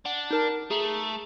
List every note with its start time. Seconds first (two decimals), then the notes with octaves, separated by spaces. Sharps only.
0.05 D4 F#5
0.31 D#4 A#4 A5
0.70 A3 G#4 A#5